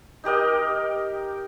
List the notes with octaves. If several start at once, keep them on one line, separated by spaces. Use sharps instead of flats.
D#4 G4 A#4 D#5